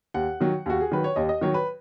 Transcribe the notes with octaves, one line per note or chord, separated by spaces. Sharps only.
D#2 F#5
D#3 F#3
D#2 F#4
G#4
D#3 F#3 B4
C#5
D#2 D#5
D#5
D#3 F#3 C#5
B4